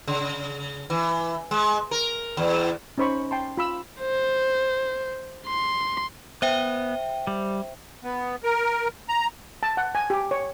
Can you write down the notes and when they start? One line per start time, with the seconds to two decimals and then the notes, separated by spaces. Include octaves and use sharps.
0.08 C#3
0.90 E3
1.51 G#3
1.91 A#4
2.37 E2
2.98 C#4 D#4 C5 B5 C#6
3.31 G5 A5 C6
3.57 F4 B5 E6
4.01 C5
5.47 C6
6.42 B3 C5 E5 G5
7.27 G3
8.04 B3
8.43 A#4
9.08 A#5
9.63 A5
9.77 F#5
9.95 G#5
10.10 G4
10.31 C#5